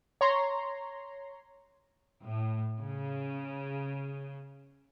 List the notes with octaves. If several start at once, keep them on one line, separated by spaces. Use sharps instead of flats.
C#5 A#5 C6
A2
C#3